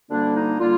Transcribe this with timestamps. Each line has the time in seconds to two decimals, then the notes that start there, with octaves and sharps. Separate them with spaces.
0.10 D2 D3 G3 A#3 D4
0.35 D#4
0.59 D3 G3 A#3 F4